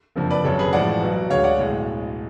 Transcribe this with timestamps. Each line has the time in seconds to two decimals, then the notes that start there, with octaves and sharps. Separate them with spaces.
0.16 F#1 F2 D3 F3
0.30 B4 D5
0.45 G#1 F#2 C#3 A4 C#5
0.59 G#4 B4
0.73 A1 A2 F3 G#3 D5 F#5
1.02 B1 B2 F#3
1.30 D2 D3 G#3 C#5 F5
1.44 D5 F#5
1.59 B1 A2 G#3